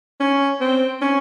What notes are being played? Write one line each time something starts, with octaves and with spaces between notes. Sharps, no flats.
C#4
C4
C#4